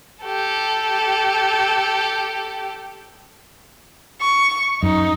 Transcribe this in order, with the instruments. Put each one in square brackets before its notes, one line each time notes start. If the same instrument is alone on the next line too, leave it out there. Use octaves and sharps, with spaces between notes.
[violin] G4 A4
[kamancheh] C#6
[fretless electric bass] F#2 [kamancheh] D#4